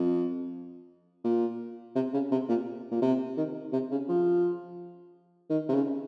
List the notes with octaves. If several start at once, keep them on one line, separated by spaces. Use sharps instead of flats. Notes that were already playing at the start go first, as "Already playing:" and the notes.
Already playing: F2
A#2
C3
C#3
C3
A#2
A#2
C3
D#3
C3
C#3
F3
D#3
C3
C#3